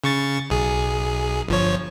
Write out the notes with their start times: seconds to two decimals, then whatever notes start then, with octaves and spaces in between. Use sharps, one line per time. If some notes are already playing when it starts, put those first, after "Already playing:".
0.04 C#3 C#6 A6
0.50 B1 G#4
1.48 G1 F3 C#5